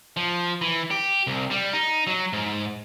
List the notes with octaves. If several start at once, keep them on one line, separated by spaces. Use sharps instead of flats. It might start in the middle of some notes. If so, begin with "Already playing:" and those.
F3
E3
G4
C2
G3
D#4
F#3
G#2